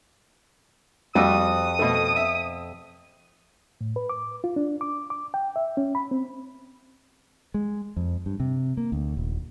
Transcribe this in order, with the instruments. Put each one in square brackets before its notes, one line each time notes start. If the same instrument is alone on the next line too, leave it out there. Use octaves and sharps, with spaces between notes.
[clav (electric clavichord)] F2 [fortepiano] G3 F#4 E6 [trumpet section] D#6
[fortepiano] B2 A3
E5
[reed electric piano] A2
B4
D6
F4
D4
D6
D6
G5
E5
C#4
B5
C4
[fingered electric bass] G#3
F2
G2
C3
A#3
D2
D#1